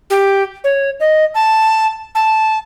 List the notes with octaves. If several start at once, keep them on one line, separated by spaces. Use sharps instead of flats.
G4
C#5
D#5
A5
A5